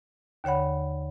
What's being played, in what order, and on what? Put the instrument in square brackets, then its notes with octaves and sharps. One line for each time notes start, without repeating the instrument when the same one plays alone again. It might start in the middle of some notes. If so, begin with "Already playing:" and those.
[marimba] D#2 D3 C#5 F#5 B5